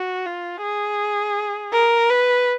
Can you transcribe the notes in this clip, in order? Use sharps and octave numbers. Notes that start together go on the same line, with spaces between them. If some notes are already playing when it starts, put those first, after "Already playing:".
Already playing: F#4
F4
G#4
A#4
B4